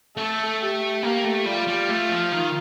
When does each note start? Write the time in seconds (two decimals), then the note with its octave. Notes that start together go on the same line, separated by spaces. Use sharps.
0.17 A3 A4
0.60 G4
1.03 A#3 G4
1.24 A3
1.46 G3 F4
1.67 G3
1.88 A3
2.09 F3
2.32 D#3